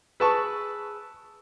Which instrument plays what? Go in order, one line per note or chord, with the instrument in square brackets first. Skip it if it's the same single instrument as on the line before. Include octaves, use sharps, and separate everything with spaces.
[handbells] G#4 B5 E6 [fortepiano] B4 A5 C#6